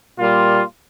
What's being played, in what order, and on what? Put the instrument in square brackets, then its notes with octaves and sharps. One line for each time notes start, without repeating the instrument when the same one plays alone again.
[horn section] A#2 G3 A#3 F4